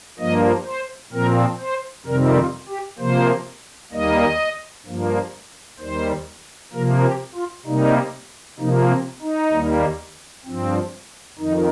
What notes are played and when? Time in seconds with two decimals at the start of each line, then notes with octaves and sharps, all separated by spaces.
0.19 G2 F3 A#3 D#5
0.66 C5
1.12 A#2 F3 C4 A#4
1.60 C5
2.06 F2 C3 D#3 G3 C4 A#4
2.37 F4
2.69 G4
2.99 C3 F3 A#3 C5
3.92 D#2 D#3 G3 A#3 D#5
4.86 G2 F3 A#3
5.79 D#2 D#3 G3 C5
6.73 C3 F3 A#3 A#4
7.03 G4
7.35 F4
7.66 C3 G3 A#3 D#4
8.59 C3 F3 A#3 D#4
8.90 C4
9.22 D#4
9.52 D#2 D#3 G3 A#3
10.45 G2 F3 C4
11.39 F2 D#3 D#4